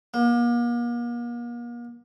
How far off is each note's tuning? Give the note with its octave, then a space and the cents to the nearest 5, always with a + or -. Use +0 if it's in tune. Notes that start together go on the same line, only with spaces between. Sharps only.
A#3 +40